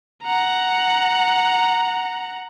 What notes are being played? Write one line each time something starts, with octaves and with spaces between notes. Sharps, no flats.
F#5 A#5